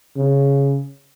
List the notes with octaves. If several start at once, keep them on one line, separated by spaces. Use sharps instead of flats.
C#3